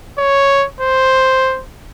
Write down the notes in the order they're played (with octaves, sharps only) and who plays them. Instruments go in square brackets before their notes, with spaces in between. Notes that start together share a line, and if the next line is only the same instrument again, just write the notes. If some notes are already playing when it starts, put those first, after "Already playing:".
[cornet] C#5
C5